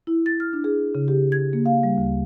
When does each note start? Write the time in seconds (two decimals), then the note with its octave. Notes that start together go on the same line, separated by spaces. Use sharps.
0.07 E4
0.26 A6
0.40 F6
0.53 D4
0.64 G#4
0.95 C#3
1.08 G4
1.32 G#6
1.53 A#3
1.66 F5
1.83 G3
1.98 D2